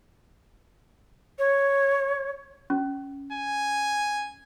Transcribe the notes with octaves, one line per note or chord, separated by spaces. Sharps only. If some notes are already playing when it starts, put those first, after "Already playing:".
C#5
C#4
G#5